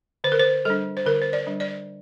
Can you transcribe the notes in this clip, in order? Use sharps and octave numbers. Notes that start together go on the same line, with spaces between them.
D3 C5
A#4
C5
G3 D4 A4
C5
D3 A#4
C5
D5
G3 D4
D5